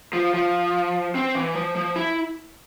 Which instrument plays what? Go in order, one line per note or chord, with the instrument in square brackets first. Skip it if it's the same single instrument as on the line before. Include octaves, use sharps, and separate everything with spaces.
[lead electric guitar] F3
F3
C4
E3
F3
F3
E4